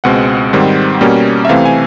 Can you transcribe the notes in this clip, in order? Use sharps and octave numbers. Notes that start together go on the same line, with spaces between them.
C#2 B2 G#3 C4 F#5
G#2 D#3 G3 C4
B2 G3 A#3 C#4
E5
C3 E3 A3 C4 F5
G#5